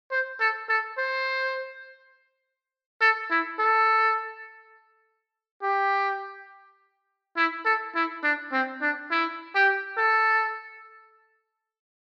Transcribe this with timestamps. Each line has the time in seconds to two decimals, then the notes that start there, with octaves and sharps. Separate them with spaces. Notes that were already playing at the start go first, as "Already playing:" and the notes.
0.11 C5
0.40 A4
0.69 A4
0.98 C5
3.01 A4
3.31 E4
3.59 A4
5.63 G4
7.37 E4
7.65 A4
7.95 E4
8.23 D4
8.52 C4
8.82 D4
9.11 E4
9.55 G4
9.98 A4